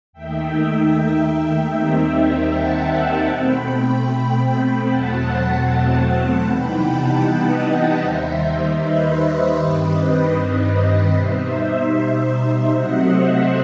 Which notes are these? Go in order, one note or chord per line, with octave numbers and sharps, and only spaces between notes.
D#2 D#3 A3 D#4 E5 G5
D#2 D#3 G3 C4 D#4
F#5 A5
B2 A3 C4 G5 B5
E2 B2 F#3 A3 C4 F#5 A5
F#5 A5
C3 E3 G3 B3 D#4 G5 B5
F#5 A5
B4 D#5
D#5 F#5
D#2 D#3 G3 D#4 C5 E5
B4 D#5
G2 D#3 G3 C4
B4 D#5
B4 D#5
B2 G3 D#4 C5 E5
C3 F#3 A3 C4 D#5 F#5
C5 E5